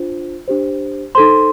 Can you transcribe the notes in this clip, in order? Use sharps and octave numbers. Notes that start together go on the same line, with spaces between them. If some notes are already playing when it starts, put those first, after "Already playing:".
Already playing: D4 F4 C5
D4 G4 C5
D#4 A4 C5 C6